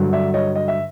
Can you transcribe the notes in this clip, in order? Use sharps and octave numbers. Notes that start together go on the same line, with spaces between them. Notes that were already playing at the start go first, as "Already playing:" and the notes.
Already playing: G2 D3 F#3
D5 E5
C#5 D#5
D#5
E5